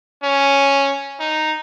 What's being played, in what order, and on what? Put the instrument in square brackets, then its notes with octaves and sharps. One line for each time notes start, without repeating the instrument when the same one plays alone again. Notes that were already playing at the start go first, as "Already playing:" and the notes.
[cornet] C#4
D#4